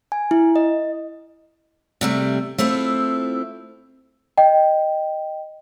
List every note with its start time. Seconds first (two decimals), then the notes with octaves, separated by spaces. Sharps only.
0.12 G#5
0.31 E4
0.56 D#5
2.01 C3 G3 A3
2.58 A3 C4 E4 F4
4.37 D#5 G5